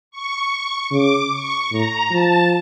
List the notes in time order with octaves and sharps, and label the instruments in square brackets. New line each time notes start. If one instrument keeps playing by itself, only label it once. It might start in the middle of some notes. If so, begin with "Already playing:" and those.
[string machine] C#6
[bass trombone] C#3 [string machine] D6
[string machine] C#6
[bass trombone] A2 [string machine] A#5
[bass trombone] F3 [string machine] A5